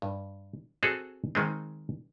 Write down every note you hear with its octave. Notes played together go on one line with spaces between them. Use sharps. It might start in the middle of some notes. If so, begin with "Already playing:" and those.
G2
C4 F#4 G#4 A4
D#3 G#3 C4